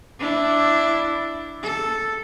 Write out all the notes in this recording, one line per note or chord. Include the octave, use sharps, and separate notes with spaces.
D4 E4
A4